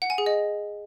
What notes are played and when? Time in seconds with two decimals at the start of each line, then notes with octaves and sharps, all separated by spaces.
0.02 F#5
0.10 G#5
0.18 G#4
0.26 D#5